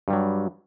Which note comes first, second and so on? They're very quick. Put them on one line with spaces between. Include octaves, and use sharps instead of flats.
G2 G3 F#3